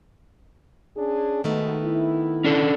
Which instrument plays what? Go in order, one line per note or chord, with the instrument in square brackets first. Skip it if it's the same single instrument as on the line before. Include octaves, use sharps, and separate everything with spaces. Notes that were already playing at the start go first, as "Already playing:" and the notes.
[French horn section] C#4 D4 G#4
[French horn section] G#2 B2 D#4 [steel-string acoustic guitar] D#3 A3 B3
[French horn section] E4
[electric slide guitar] C#4 D4 A4